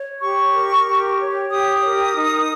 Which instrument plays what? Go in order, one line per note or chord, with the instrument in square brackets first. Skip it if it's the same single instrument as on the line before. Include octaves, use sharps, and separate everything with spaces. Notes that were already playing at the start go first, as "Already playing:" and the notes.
Already playing: [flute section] C#5
G4 C#6
A#4
G4
C#5
G4 D#6
A#4
D#4